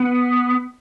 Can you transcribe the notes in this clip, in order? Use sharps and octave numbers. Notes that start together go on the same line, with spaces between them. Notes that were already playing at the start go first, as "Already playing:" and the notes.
Already playing: B3